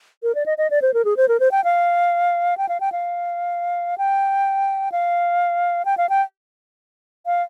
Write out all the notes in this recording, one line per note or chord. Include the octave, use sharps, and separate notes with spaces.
A#4
D5
D#5
D#5
D5
C5
A#4
G#4
C5
A#4
C5
G5
F5
G5
F5
G5
F5
G5
F5
G5
F5
G5
F5